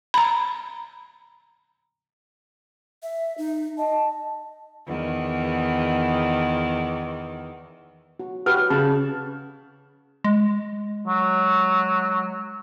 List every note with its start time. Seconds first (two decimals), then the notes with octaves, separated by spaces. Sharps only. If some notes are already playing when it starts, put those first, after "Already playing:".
0.14 A#5 B5
3.03 E5
3.38 D#4
3.78 D#5 A5
4.87 E2 D#3
8.20 F#4
8.46 F#4 G4 B4 F6
8.70 C#3 A5
10.24 G#3
11.07 F#3